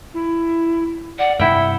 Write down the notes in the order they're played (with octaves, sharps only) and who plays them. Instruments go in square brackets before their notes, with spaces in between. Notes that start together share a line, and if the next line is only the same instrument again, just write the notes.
[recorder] E4
[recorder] D5 [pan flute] F#5
[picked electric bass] G2 C3 [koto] E4 G5 [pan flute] E5 [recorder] F#5